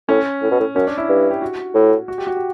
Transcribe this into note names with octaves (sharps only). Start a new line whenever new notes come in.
A2 C#4
A2
B2
A2
F#2 C#4
D4
E4
G2
G4
F#4
A2
F#4
G4
F#4
G4